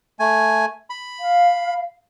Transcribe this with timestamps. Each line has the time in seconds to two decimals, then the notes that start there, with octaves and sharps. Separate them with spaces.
0.20 A3 G#5
0.90 B5
1.20 F5